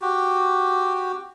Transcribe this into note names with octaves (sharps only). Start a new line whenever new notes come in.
F#4 G4